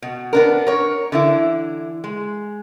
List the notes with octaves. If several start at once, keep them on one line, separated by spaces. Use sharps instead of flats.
B2
B3 D4 A#4
A#4 C#5
D3 E3 E4
G#3